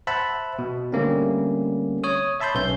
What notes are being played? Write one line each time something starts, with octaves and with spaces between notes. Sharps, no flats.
C5 E5 F#5 A5 B5
B2
D3 G3 A3 A#3 C4 C#4
C#5 D#6
C#5 E5 A5 B5 C6 G6
B1 B3 C#4 G6